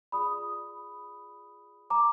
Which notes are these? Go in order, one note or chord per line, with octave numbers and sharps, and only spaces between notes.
F4 G#4 D5 B5 D#6
A#5 D6